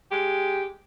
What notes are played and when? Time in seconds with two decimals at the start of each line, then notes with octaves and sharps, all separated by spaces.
0.11 G#3 G4